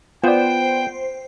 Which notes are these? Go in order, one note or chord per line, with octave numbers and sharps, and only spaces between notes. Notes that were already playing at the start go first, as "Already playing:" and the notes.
B3 F4 C5 D5 G5